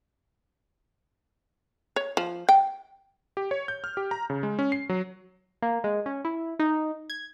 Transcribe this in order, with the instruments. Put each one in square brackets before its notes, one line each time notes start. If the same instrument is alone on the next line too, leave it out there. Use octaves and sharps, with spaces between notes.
[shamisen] C#5
F3
G5
[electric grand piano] G4
C#5
G6
F6
G4
A#5
C#3
G#3
C#4
C7
F#3
[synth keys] A#3
G#3
C#4
E4
D#4
G#6